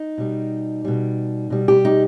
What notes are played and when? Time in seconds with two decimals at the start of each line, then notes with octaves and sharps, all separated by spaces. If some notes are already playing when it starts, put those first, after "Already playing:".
Already playing: D#4
0.18 B2 G3
0.85 B2 G3
1.50 B2 G3
1.68 G4
1.85 D#4